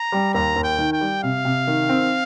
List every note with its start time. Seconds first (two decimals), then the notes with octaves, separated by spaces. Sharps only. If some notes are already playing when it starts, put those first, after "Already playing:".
Already playing: A#5
0.12 G3
0.34 D#2 A#5
0.56 D#2
0.64 G5
0.78 D#3
0.93 G5
1.01 G3
1.23 C3 F5
1.45 C3
1.67 D#3
1.89 C4